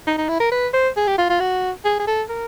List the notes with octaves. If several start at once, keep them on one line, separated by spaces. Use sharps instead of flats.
D#4
D#4
E4
A#4
B4
C5
G#4
G4
F4
F4
F#4
G#4
G#4
A4
A#4